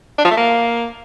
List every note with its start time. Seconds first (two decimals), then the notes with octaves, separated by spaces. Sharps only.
0.18 D4
0.24 F3
0.31 A3
0.37 A#3